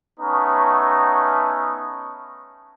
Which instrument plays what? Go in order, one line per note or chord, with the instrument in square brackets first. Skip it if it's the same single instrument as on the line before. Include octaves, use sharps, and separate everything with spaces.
[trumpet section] A3 B3 C#4 D#4